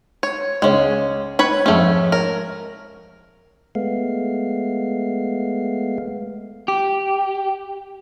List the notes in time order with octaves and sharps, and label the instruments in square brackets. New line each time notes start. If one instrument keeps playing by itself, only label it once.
[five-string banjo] C#5
[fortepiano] C#2 C#3 C#5 [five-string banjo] G#3 C#4
[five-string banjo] B4 C#5 B5
[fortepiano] F2 G#2 [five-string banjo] A3 C#4
[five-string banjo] A#4 [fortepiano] C#5
[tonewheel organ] G#3 A3 B3 F5
[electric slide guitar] G4